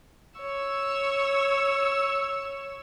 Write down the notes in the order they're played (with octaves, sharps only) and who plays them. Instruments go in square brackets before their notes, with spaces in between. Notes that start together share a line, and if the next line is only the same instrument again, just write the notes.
[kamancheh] C#5 E6